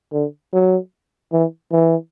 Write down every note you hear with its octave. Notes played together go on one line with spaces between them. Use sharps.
D3
F#3
E3
E3